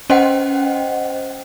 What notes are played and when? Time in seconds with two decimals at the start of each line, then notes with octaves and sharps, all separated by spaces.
0.10 C#4 C5 D#5 F#5 G5